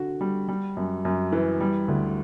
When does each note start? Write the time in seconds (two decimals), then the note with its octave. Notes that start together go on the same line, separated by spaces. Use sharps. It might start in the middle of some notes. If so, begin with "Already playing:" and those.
Already playing: D3 F#4
0.21 G3
0.49 G3
0.77 F#2
1.05 F#2
1.32 E3
1.60 G3
1.88 D2